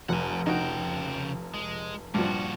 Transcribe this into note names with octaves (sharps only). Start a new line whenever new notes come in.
F1 F#5 G#5
C#3 D#4 F#4 G5
G#3
G2 A#2 F3 F#4